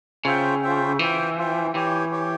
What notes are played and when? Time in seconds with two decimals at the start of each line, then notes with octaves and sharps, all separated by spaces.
0.25 C#3 F4 C5 E5 G5
0.62 F4 C5 E5 G5
0.99 E3 F4 C5 E5 G5
1.37 F4 C5 E5 G5
1.74 E3 G4 C#5 G5
2.12 G4 C#5 G5